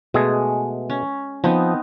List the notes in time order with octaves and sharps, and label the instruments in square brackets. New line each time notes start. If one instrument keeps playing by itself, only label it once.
[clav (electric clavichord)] B2 A3 G#4 [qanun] G#3
[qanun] C#4
[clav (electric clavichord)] F3 [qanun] B3 C4 D#4